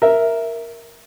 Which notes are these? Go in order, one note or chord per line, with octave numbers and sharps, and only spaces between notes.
A#4 E5